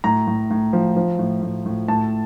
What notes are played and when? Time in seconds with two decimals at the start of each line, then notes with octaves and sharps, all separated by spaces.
0.04 A2 A#5
0.27 A2
0.50 A2
0.73 F3
0.96 F3
1.19 A2
1.42 A2
1.66 A2
1.88 A2 A5